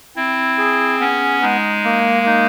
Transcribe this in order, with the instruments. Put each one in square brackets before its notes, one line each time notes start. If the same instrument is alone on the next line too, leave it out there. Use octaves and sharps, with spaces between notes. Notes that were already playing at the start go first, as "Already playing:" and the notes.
[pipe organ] C4 [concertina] E4
[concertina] G#4
[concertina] B3 [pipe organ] C#4
[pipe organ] G#3 [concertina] D#4
[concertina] A#3
D#4